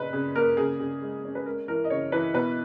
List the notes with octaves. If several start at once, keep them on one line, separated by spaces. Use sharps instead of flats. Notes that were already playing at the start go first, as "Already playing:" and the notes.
Already playing: A#2 C#3 D#4 B4
C#3
A#3 A#4
C#3 G#4
C#3
G#3
C#4
B4
G#3 A#4
E3 A#4
D#5
C#3 C#5
E3 B4
B2 B4